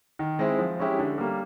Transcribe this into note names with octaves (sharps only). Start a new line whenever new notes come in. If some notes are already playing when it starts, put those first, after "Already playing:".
D#3
G#3 C4 E4
F3
G#3 C#4 E4 G4
D3
G3 A#3